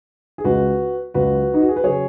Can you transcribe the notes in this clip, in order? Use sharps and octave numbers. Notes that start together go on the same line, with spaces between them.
G#4
C#2 C#3 G#3 F#4 B4
C#2 C#3 F#3 F#4 B4
D#4
F#4
G#4
B4
C#3 F#3 G#4 C#5